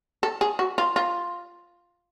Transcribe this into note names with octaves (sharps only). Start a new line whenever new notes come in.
A4
G#4
F#4
F4
F4